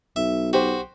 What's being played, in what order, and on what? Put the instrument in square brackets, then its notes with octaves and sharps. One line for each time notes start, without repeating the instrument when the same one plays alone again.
[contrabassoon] B1 [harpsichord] E5
[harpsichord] F#4 [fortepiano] G4 C5